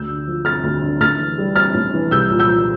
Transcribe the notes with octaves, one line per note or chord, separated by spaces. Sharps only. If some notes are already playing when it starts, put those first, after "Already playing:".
Already playing: D2 E6 G6
D3
F3
C4 F6 A6
D2
D3
A2 F6 A6
E3
G3
C4 F6 A6
A2
E3
C2 E6 G6
A#2
E6 G6
F3